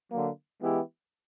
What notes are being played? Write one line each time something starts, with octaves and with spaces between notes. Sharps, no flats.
D3 F#3 A#3
E3 G#3 B3 E4 G4